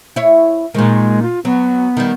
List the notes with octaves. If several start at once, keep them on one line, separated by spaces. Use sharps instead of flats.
E4 C#5
A#2 D#3 G#3
F4
F#3 B3
D#3 G3